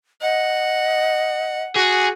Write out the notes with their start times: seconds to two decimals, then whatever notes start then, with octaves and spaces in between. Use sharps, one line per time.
0.22 D#5 F#5
1.76 F#4 G#4